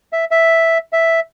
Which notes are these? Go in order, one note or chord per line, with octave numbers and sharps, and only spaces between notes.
E5
E5
E5